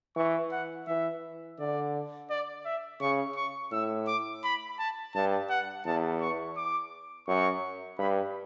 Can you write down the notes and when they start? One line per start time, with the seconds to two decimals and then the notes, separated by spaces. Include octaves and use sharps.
0.16 E3 C#6
0.52 F#5
0.88 E3 E5
1.59 D3 D5
2.30 D5
2.65 E5
3.01 C#3 C#6
3.36 C#6
3.72 A2 E6
4.07 D6
4.44 B5
4.79 A5
5.15 G2 A5
5.50 F#5
5.85 E2 A5
6.21 C#6
6.57 D6
7.27 F#2 C#6
7.99 G2 B5